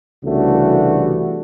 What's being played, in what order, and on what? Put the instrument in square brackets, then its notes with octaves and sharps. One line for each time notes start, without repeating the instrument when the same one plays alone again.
[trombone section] C2 C#3 E3 A3 D4 F#4